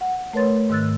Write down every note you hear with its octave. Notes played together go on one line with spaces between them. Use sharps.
F#5
A3 A#4 B4 C#5 C6 A6
G#2 D#3 E6 F#6 A6